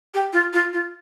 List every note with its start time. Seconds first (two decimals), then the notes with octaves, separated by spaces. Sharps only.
0.14 G4
0.33 F4
0.53 F4
0.73 F4